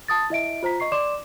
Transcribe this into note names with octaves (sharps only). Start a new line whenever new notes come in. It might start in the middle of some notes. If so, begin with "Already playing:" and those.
A5 D#6 A6
E4 D#5 E5 D7
F4 C5 A#5 B6
D#5 C#6 C7
D5 C6 D6 E7